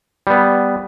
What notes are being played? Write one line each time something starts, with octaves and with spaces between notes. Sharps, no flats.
G3 B3